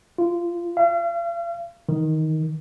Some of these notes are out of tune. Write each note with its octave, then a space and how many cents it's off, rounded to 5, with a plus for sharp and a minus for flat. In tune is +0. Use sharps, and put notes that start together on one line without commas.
F4 -15
F5 -40
D#3 +10